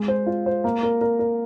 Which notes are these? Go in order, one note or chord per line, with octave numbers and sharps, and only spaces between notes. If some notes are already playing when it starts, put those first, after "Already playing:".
Already playing: G#3
C5
F4
C5
A#3
A#4
A#4
A#4